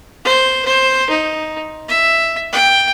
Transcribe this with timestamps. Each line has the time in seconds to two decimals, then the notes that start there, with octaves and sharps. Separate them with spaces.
0.25 C5
0.65 C5
1.10 D#4
1.89 E5
2.53 G5